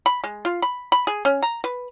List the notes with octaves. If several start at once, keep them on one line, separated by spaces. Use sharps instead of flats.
B5
G#3
F4
B5
B5
G#4
C#4
A#5
B4